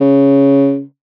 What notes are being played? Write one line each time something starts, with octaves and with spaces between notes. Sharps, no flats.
C#3